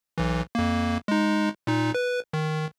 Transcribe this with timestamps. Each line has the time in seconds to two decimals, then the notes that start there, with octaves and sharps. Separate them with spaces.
0.18 B1 E3
0.55 F2 A#3
1.08 G#3 D#4
1.67 A#2 D#4
1.95 B4
2.33 D#3